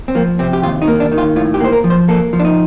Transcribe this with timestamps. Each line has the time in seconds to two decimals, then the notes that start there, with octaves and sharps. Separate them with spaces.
0.08 C4
0.15 F3 A#3
0.39 C3 C4
0.53 G4
0.63 D#2 F4
0.82 D#4
0.88 A#3
1.00 D4
1.12 D#3
1.18 F4
1.36 A2 F4
1.54 G4
1.60 A#3 C5
1.73 A#4
1.84 F3
1.90 C5
2.08 A#3 A4
2.33 F3
2.40 D4
2.44 D#4